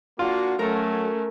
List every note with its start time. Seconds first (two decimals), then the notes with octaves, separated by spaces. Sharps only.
0.19 A#3 D4 F4 F#4
0.59 F#3 A3 C#4 A4 A#4